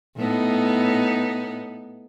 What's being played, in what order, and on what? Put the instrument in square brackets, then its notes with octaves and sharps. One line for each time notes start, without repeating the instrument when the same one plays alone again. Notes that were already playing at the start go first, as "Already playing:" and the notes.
[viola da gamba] A2 B3 D#4